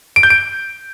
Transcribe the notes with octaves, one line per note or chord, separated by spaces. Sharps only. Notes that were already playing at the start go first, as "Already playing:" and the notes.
D7
G6
D7